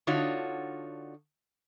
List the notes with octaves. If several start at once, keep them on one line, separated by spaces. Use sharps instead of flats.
D3 D4 D#4 F4 F#4 C#5